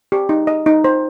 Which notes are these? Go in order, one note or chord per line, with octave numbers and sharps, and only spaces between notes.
G4
D#4
D#5
D#4
C5